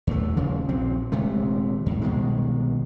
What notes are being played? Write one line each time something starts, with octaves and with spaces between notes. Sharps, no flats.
D#2 A3
D#1 C#3 F3
A#1 F#3 C4
D#1 C3 G#3 A3
E2 G#2
C2 B2 D#3 G#3